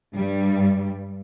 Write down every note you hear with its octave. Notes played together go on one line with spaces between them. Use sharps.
G2 G3